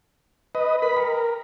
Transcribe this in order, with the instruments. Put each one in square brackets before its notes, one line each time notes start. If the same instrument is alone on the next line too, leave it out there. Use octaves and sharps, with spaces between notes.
[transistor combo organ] B4 D#5
[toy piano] A#4 B4 D#6 [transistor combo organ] B5
[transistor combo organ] A#4 [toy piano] G5